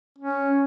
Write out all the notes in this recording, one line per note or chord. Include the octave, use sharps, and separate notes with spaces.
C#4